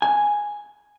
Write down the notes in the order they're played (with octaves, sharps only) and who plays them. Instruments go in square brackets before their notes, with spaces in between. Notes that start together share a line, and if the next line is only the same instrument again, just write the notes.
[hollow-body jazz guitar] G#5